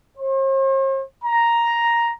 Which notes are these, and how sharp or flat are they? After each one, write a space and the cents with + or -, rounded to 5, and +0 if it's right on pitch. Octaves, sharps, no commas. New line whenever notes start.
C5 +45
A#5 +5